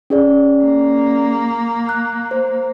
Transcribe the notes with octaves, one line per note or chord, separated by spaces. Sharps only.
C#4 G#4 D5
A#3
F#6
C5